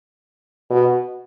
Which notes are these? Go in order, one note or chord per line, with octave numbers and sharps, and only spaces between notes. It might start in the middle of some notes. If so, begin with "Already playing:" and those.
B2